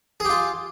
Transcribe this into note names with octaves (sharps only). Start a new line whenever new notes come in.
F4 G4 G#4